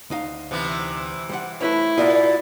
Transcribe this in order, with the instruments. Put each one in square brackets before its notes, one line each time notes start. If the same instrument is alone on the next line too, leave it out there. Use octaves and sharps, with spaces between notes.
[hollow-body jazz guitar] D2 D#4 F5
[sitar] C3 E3 B3
[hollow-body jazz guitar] G3 C5 F#5
[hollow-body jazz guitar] A3 B4 C#5 [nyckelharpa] E4
[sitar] A#2 [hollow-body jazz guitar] F4 F#4 A#4 [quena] D5